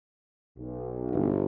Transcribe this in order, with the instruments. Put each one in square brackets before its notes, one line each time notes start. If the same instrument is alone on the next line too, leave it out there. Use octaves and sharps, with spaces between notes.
[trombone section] B1
[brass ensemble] G1